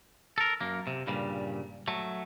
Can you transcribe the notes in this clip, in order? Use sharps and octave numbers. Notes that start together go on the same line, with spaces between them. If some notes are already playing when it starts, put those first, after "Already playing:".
A4 A#4
F#2 A#3
C3
G2 A#2 C#3 G3
F#3 A3